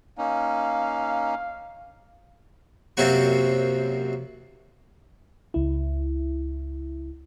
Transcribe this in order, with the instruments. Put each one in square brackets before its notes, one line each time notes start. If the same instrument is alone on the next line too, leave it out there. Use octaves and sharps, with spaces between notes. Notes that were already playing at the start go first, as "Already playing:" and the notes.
[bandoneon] A#3 C#4 D#4 [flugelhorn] F5
[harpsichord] F#2 C3 A#3 C4 F#4 C#6
[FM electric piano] C#2 E4